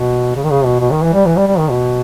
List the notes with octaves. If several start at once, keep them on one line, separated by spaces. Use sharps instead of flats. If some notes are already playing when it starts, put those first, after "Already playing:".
Already playing: B2
C#3
D#3
C#3
B2
B2
D#3
E3
G3
E3
G3
G3
D#3
B2